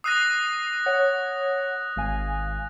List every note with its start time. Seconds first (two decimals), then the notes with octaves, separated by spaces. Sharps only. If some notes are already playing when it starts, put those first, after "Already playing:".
0.04 D#6 E6 F#6 A#6 C7 D#7
0.86 C#5 F#5
1.96 G#1 F5 G#5